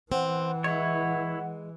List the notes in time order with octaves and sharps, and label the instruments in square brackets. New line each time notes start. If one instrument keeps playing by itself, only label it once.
[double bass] E3 [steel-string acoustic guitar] C4 [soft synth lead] F#5
[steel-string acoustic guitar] G#3 [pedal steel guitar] E4 C#5